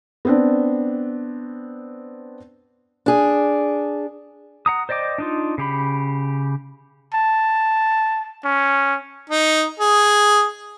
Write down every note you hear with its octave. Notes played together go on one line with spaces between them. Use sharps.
B3 C4 D4
D4 G#4
F#5 A#5 D#6
C5 D5 D#5 G5 D6
D4 D#4 F4
C#3 G4 B5
A5
C#4
D#4
G#4